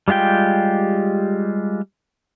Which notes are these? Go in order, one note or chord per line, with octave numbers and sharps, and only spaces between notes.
G3 G#3 F4 G4 G5